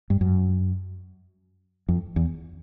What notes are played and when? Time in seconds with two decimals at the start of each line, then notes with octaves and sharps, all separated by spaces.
0.10 G2
0.21 F#2
1.89 F2
2.16 E2